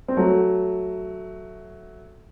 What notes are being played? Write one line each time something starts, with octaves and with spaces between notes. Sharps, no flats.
C4
F#3 A3